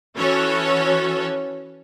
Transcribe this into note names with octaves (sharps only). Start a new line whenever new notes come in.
E3 C#4 F#4 A4 C#5